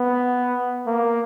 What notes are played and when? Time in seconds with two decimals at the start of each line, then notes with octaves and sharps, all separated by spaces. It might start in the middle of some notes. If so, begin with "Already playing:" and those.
Already playing: B3
0.87 A#3